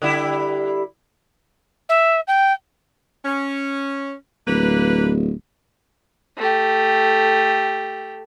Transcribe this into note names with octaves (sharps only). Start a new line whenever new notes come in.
D3 G3 E4
E5
G5
C#4
D1 A#3 B4
A3 G4